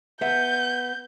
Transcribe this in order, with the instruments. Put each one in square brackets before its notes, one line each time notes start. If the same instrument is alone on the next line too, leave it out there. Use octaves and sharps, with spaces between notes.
[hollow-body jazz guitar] B3 E5 [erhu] G6